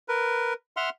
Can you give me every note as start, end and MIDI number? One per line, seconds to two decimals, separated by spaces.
0.08 0.53 70
0.08 0.53 71
0.77 0.90 76
0.77 0.90 78
0.77 0.90 84
0.77 0.90 89